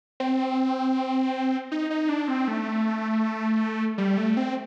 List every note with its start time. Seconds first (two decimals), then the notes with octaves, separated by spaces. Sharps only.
0.20 C4
1.72 D#4
1.90 D#4
2.09 D4
2.28 C4
2.48 A3
3.98 G3
4.17 A3
4.37 C4